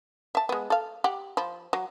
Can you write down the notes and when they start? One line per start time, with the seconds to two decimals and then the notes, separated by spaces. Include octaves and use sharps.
0.35 E5 A5
0.49 G#3 B3
0.70 A4 F5
1.04 G4 F#5
1.37 F3 B5
1.73 F#3